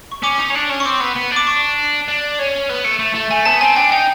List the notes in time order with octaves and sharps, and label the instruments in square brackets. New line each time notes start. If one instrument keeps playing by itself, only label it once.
[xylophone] C#6
[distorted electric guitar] C#4 [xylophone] D6
[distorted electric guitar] D#4
C#4
D4
C#4
[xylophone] C#6
[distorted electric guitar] C4 [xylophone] D6
[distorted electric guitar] B3
B3
D4
[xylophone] D6
C#6
[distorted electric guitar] D4
C#4
B3
A3
A3
A3
[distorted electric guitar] A3 [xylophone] G#5
[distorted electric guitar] B3 [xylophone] A5
[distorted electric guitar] C4 [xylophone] G#5
[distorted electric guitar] D4 [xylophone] G5
[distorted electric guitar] D#4 [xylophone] G5